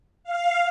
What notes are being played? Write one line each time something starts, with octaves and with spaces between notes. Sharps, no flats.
F5